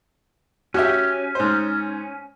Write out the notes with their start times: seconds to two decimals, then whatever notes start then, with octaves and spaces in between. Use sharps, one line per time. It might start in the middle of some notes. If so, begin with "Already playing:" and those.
0.74 C#4 F#4 G4 E5
1.35 G#2 C5